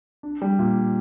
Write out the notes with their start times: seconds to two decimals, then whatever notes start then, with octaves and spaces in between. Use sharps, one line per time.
0.23 D4
0.42 G3
0.59 A#2